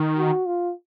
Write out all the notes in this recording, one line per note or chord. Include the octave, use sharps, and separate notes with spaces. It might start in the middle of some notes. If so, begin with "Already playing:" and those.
Already playing: D#3
F#4
F4